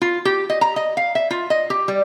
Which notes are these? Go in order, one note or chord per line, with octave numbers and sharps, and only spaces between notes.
F4
G4
D#5
A#5
D#5
F5
E5
F4
D#5
G4
G3